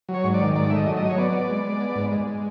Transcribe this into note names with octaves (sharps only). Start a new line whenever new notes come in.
F#3
C#5
G#2
D5
D#3
G#2 D5
A3 E5
D#5
F#3
D#5
F#3
C#5
B3 D5
B3
G#3
G#3
B3
G#2
G#3
G#3